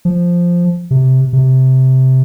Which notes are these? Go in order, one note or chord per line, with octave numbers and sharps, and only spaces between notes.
F3
C3
C3